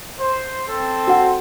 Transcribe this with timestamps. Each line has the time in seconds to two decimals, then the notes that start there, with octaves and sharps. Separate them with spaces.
0.19 C5
0.67 C4 A4
1.08 F#4 F#5